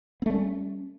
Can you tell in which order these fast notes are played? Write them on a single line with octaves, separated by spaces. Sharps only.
B3 A3 G3 C#4